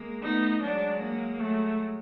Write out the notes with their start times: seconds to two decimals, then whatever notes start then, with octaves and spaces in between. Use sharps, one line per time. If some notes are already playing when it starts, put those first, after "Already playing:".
Already playing: G#3 A#3
0.22 A3 B3 D#4
0.61 F#3 G#3 D4
1.01 A#3
1.40 F#3 G#3 A3